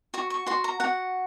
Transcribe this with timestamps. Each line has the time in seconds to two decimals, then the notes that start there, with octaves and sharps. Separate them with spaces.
0.14 F#4 C#6
0.30 C#6
0.46 F#4 C6
0.64 A#5
0.80 F#4 F#5